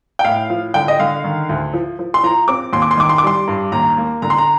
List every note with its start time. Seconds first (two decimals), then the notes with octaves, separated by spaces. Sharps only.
0.19 G5
0.25 A2 F5
0.50 F3
0.74 D3 G5
0.88 D#5
1.00 D3 F5
1.24 D#3
1.49 D2
1.73 F3
1.99 F3
2.14 C6
2.23 F3 A#5
2.48 C4 D6
2.73 D#2 C6
2.82 D6
2.91 C6
2.97 D#3 D6
3.09 C6
3.18 D6
3.23 G3 C6
3.48 G2
3.72 D#2 A#5
3.98 A#3
4.22 D3 A#5
4.30 C6
4.38 A#5